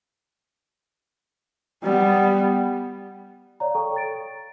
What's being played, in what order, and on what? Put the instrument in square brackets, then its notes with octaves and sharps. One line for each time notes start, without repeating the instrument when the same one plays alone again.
[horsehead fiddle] G3 B3
[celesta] C#5 D5 F5 A#5
A4 G5 C#6
A6 D7